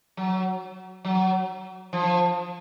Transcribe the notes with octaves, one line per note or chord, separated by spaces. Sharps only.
F#3
F#3
F3